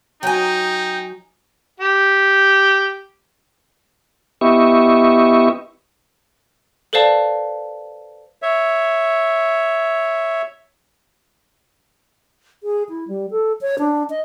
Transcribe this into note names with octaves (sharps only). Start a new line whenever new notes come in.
F#3 D#4 G5 G#5
G4
B3 E4 G4 D#5 E5 C#6
A4 B4 C5 D5 F5 A5
C#5 E5
G#4
E4
G3
A4
C#5
D4
D#5